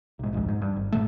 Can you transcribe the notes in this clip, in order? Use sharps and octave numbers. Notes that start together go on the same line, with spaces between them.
B1 G#2
D1 A#1 F2 G#2
G#2
G2
G#1
G#2 B2 A3